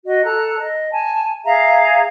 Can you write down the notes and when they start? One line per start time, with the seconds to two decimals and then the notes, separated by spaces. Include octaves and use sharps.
0.05 F#4 D#5
0.24 A4 A#5 F#6
0.58 D#5
0.92 G#5 A5
1.44 G#4 E5 F5 A#5